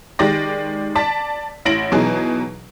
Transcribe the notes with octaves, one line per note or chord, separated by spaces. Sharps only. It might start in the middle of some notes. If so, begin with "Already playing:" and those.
D#3 G#3 G4 D5 A#6
D5 A5 B6
A1 E4 A#6 D7 F#7
B2 E3 F#3 D#4 G#4